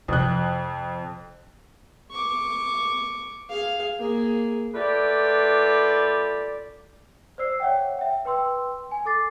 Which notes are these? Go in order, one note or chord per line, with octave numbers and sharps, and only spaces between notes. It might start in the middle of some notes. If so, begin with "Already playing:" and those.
F2 C3 F#6
C#6 D6
G#4 F5
A#3 G#4
A3 F4 G4 B4 D5
C5 D5 E6 C7
C#5 D5 E5 F#5 G5
E5 G5
B4 G5 C6 E6
G#5
A4 D6 A6 C7